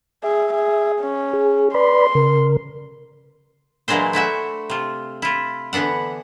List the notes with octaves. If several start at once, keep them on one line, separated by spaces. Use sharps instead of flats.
G#4 E5
G#4
C#4
G#4
B4 D5 B5 C6
C#3 A#4
A#2 E3 F#3 G#3 D4 C5
A3 E4 F#4 E5
C3 F4
E4 F4
D3 E3 B3 D4 F#5